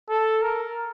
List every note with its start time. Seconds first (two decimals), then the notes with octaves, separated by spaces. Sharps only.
0.09 A4
0.42 A#4